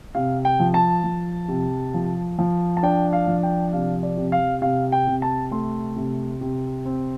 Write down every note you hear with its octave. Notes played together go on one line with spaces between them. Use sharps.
C3 F5
G5
F3
A5
F3
C3
F3
F3
A5
D4 G5
F5
F3
G5
C3 F5
D5
C3
F5
C3 F5
G5
C3
A5
A3 C6
C3
C3
C4